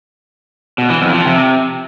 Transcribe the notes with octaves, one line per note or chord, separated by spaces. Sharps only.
B2
E3
F2
F3
C3